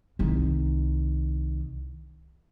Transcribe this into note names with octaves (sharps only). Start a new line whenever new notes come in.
C2 D#3